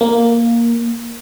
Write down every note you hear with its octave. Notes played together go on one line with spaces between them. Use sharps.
A#3